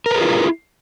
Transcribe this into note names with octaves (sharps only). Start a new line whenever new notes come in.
E4 F4 G#4 A#4 B4